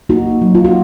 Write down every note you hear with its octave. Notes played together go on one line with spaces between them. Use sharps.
A#3 D#4 F#4
F#3
F4
F#4